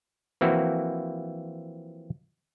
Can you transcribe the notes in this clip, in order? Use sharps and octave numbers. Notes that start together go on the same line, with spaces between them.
E3 F3 A#3 C4 E4 F#4